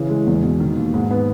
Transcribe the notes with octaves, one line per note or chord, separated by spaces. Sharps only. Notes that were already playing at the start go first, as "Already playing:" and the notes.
Already playing: C#3 E3
G#3
E2
B2
D#3
D#2
G#2
B3